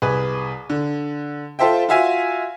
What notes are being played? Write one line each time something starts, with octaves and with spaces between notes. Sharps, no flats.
C2 G#4 B4
D3
F4 A4 C5 E5 G5
F4 F#4 E5 F5 G#5